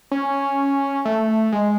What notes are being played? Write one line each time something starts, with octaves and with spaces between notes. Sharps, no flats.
C#4
A3
G#3